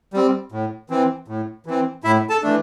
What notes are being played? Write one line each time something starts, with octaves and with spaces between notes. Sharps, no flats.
G3 C4
A2
E3 C4
A2
E3 C4
A2 E4 E5
A4 A5
E3 A3 D4